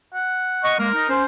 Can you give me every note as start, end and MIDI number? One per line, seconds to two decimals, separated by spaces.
0.14 0.74 78
0.64 0.77 75
0.64 0.77 85
0.79 0.89 56
0.79 0.89 58
0.79 1.10 70
0.94 1.09 63
1.09 1.25 61
1.09 1.25 72